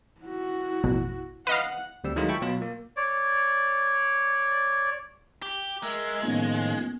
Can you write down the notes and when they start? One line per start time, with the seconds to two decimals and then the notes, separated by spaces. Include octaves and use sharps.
0.21 E4 F#4
0.84 A1 F2 B2
1.47 B4 D#5 F5 F#5
2.04 D2 G3 C4 E6
2.16 D#3 F#3 G#3 A3 E4 F4
2.29 E5 G5 A5 B5 C#6
2.41 B2 F#3 F4
2.62 A#3
2.97 C#5 D5
5.42 G4
5.83 G#3 A#4 E5
6.23 A2 D#3 F3 A#3 B3 C#4